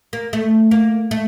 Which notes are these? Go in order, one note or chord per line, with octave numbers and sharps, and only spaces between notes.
A#3
A3
A#3
A3